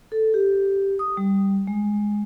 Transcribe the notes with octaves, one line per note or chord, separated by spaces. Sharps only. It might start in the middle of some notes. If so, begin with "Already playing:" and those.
A4
G4
D#6
G3
G#3